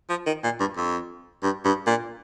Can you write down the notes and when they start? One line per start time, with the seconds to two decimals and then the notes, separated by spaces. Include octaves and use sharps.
0.10 F3
0.26 D#3
0.44 A#2
0.60 G2
0.77 F2
1.43 G2
1.65 G2
1.87 A#2